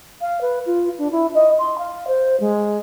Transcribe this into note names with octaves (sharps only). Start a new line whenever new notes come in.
F5
B4
F4
D4
E4
D#5
C6
F5
C5
G#3